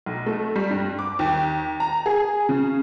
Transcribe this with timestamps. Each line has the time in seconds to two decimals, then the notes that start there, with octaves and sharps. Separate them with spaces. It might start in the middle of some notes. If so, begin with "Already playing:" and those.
0.06 B1
0.26 A3
0.56 G3
0.71 G2
0.99 D6
1.19 D#2
1.80 A#5
2.06 G#4
2.49 C#3